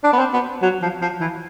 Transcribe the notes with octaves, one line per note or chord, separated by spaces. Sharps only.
D4
B3
C4
B3
F#3
F3
F3
E3